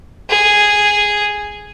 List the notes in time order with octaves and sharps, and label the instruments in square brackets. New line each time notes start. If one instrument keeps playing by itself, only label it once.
[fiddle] G#4